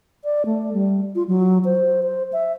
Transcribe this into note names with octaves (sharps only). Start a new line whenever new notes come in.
D5
A3
G3
F4
F#3
C5
C5
E5